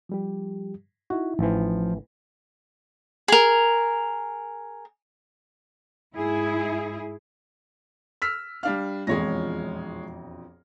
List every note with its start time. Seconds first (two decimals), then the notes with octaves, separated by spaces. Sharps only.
0.09 F3 G3 G4
1.10 D#4 E4 F#4
1.39 A1 E3 F3
3.28 G#4 A#4
6.14 G#2 E4 G#4
8.22 E6 F6 B6
8.63 G3 D4 F5 F6
9.07 E1 A#1 F2 G#3 C#5 A#6